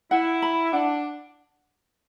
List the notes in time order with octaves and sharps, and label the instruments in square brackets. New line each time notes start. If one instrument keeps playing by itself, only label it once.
[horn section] E4 [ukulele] F#5
[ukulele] B5
[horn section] D4 [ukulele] F#5